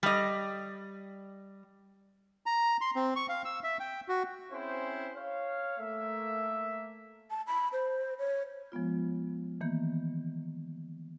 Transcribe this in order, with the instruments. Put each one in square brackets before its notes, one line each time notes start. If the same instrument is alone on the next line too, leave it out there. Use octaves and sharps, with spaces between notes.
[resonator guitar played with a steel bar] G3 D#5
[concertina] A#5
C6
C4
C#6
F5
E6
E5
G5
F#4
[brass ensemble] C4 C#4 E4 G#4 C5
C#5 F5
A3 A#3 E5
[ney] A5
B5
C5
C#5
[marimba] F3 G#3 B3 F4
D#3 E3 A#3 B3 G6